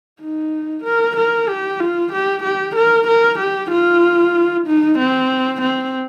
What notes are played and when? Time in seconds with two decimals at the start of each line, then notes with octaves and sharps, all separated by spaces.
0.21 D#4
0.84 A#4
1.16 A#4
1.48 G4
1.80 F4
2.12 G4
2.44 G4
2.76 A#4
3.08 A#4
3.39 G4
3.71 F4
4.66 D#4
4.99 C4
5.61 C4